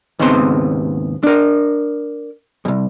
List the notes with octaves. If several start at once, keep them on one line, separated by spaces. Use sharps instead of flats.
D#2 G#2 C#3 B3 C4 C6
D4 A#4
C2 F2